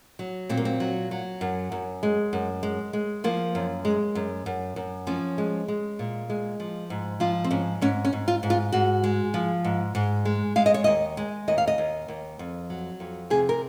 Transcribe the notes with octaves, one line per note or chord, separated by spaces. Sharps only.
F#3
A#2 C4
A#3
C4
F#3
F#3
F#2
F#2
G#3
F#2
G#3
G#3
F3 A#3
F#2
G#3
F#2
F#2
F#2
F3 C#4
G#3
G#3
A#2
G#3
F3
G#2
F3 F4
C4
G#2 C#4
G#2 C#4
C#4
G#2
F4
G#2
F4
G#2 F#4
G#3
F3
G#2
G#2
G#3
G#3 F5
D#5
C#5
D#2 D#5
G#3
D#2 D#5
F5
D#5
D#2
D#2
F2
F#3
F2
C3 G#4
A#4